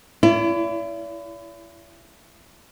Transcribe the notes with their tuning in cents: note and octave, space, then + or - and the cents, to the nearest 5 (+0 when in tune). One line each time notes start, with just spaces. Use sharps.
E4 +35 D5 -45